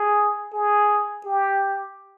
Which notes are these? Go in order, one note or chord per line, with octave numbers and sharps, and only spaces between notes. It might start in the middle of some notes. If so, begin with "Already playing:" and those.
Already playing: G#4
G#4
G4